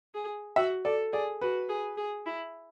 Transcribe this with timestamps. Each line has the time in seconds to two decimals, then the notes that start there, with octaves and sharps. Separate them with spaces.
0.15 G#4
0.56 F#4 E5
0.85 A4 D5
1.13 G#4 D5
1.41 F#4 B4
1.69 G#4
1.97 G#4
2.26 E4